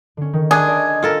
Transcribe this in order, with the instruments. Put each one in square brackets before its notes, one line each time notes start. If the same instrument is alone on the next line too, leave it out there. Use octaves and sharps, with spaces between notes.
[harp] D3 C#4
D#3
[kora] D4 [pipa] G#4 [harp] E5 B5 C6
[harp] D5 D#5 A5
[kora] F4 A4 A#4 [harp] F5 C6 F6